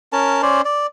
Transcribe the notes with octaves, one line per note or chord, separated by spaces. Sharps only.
C#4 A#4 A5
C#4 C5 D5
D5